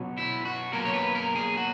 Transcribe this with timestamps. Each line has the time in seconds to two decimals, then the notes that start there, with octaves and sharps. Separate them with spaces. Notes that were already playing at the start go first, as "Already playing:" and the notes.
Already playing: B2 F#3 C#4
0.18 E4
0.45 F#4
0.73 B2 F#3 A#3 C#4 A#4
0.85 C#5
0.93 B4
1.15 A#4
1.35 G#4
1.57 F#4